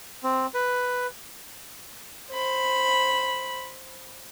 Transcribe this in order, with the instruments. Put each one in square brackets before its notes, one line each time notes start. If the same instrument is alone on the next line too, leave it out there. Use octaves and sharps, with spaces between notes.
[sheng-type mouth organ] C4
B4
[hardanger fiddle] C5 B5